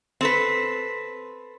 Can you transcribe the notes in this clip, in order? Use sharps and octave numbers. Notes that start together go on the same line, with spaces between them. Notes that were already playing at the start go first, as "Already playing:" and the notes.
C4 A4 B4